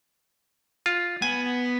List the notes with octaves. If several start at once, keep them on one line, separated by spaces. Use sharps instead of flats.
F4
B3 G#5